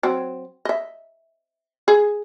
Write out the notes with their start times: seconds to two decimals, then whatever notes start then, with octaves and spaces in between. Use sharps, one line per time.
0.03 F#3 C4
0.65 D#5 E5
1.88 G#4